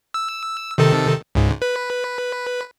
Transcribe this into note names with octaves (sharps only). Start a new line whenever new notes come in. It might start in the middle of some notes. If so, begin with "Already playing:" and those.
E6
C3 D#3 A4
C#2 G#2
B4